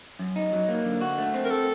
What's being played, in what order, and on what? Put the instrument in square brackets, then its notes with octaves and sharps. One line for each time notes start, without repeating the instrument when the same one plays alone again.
[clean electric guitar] F#2
D#4
F#3
A#3
D3
F#4
A3
C4
[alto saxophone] A#4
A4